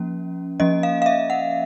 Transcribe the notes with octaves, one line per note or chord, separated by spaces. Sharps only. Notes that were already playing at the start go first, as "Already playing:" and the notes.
Already playing: F3 A#3 C#4
F3 A#3 C#4 D#5
F5
F5
E5
F#5